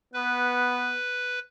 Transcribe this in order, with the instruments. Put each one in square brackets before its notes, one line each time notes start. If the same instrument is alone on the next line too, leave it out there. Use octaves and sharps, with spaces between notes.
[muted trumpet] B3 [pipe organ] B4